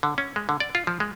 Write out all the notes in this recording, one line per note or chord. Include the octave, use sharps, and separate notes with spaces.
D3
C#4
G#3
D3
D5
F4
F3
G#3